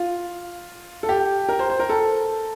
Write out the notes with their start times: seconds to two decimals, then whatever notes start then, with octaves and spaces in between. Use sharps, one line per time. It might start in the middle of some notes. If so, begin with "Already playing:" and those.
Already playing: F4
1.03 A4
1.09 G4
1.49 A#4
1.59 C5
1.70 C5
1.80 A#4
1.89 A4